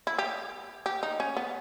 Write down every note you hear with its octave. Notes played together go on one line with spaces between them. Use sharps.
E4
G4
G4
D#4
C#4
B3